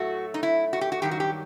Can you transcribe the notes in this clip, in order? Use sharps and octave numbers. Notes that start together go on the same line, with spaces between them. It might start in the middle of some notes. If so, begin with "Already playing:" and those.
Already playing: A2 F#3 A3 F#4
D#4
E4
F#4
G4
F#4
G2 D#3 F#3 G4
F#4
G4